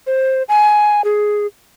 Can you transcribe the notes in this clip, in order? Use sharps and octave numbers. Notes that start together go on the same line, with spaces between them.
C5
G#5
G#4